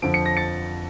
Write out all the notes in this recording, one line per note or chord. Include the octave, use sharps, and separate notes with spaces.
F2 D3 F3 D7
C#7
A#6
A6 C#7